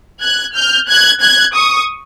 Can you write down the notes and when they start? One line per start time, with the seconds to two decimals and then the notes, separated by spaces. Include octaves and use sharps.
0.21 F#6 G#6
0.55 F6 G6
0.88 F#6 G#6
1.21 F#6 G#6
1.55 C#6 D#6